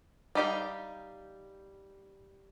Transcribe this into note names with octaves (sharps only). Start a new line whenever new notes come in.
G3 D#4 G4 F5 G5